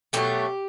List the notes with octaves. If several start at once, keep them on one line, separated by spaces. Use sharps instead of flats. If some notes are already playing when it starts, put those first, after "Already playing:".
B2 F#3 A3 G4